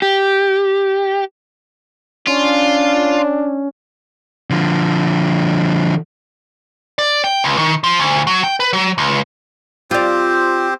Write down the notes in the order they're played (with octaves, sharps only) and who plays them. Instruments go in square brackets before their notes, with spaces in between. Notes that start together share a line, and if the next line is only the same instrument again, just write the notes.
[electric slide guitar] G4
[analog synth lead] C#4 [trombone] D4 [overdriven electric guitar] F4
[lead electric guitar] D3 F3
D5
G5
C#2
D#3
F3
D2
F#3
G5
B4
F#3
C#2
[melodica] C4 G4 C5 [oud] F4 D5